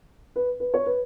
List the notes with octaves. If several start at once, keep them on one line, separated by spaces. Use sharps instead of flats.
B4
B4
C#5
B4